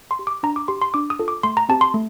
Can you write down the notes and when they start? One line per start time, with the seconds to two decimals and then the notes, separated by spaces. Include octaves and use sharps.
0.11 C6
0.19 G4
0.27 D6
0.43 D4 A#5
0.56 D6
0.68 G4 C6
0.82 C6
0.94 D4 D6
1.10 D#6
1.19 F4 A4
1.28 D6
1.43 A3 C6
1.57 A#5
1.69 C4 G4 A5
1.81 C6
1.94 A3